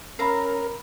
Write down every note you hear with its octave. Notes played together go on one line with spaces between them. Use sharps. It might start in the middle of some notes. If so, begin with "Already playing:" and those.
C#4 A#4 E5 F5 A#5 B5 C7